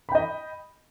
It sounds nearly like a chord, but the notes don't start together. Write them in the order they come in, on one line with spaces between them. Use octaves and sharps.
B5 G5 D#5